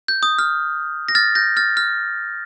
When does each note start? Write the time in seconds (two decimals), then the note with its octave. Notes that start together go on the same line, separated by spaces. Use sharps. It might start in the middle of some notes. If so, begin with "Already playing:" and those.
0.08 G6
0.23 D#6
0.39 F6
1.09 A#6
1.15 F6 A6
1.35 G6 A#6
1.57 F6 A6
1.77 F6